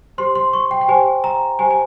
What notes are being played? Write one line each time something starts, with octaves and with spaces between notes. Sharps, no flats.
G4 C5 C6
C6
C#6
G5
G5
G4 C5 G#5
A#5
G4 C5 G#5
G#5